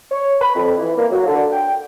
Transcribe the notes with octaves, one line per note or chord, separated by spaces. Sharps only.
C#5
B5
F2
E3
A#3
F#3
D3
G5